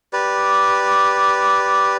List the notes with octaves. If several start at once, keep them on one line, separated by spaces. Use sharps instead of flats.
G4 B4 D5